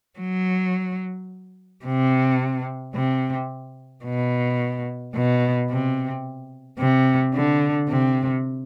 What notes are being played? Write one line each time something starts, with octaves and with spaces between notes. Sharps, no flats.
F#3
C3
C3
B2
B2
C3
C3
D3
C3